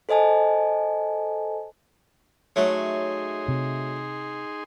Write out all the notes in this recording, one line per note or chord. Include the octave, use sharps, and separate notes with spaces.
A4 C5 D#5 G#5 A5
F#3 A3 D#4 G#4 C#5 E5 C6
C3